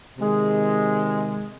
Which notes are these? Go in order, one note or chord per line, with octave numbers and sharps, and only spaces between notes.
C3 D#3 G#3